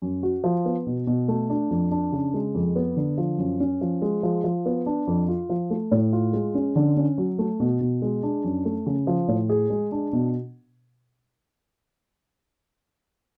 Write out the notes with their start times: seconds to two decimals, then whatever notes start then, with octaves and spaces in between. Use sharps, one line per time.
0.02 F#2
0.23 F#4
0.44 F3
0.65 B3
0.87 B2
1.07 B2
1.28 A3
1.50 D4
1.70 F2
1.91 D4
2.12 C#3
2.34 G#3
2.55 F2
2.76 B3
2.96 D3
3.18 F3
3.38 F#2
3.60 C#4
3.81 F3
4.02 G#3
4.23 F3
4.44 F3
4.66 B3
4.86 D4
5.07 F2
5.28 F4
5.50 F3
5.70 A3
5.91 A2
6.13 F4
6.33 G#3
6.55 C#4
6.76 D3
6.97 C#4
7.18 F#3
7.39 A3
7.60 B2
7.81 B2
8.02 G#3
8.23 D4
8.44 F#2
8.65 A3
8.86 C#3
9.07 F3
9.28 A2
9.50 G#4
9.70 G#3
9.92 D4
10.13 B2